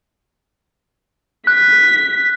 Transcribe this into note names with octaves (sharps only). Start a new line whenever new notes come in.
F#6 B6